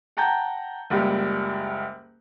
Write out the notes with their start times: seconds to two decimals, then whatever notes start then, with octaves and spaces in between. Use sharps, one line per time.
0.17 F#5 G5 A5 A#5 G6
0.90 F#1 C#2 G3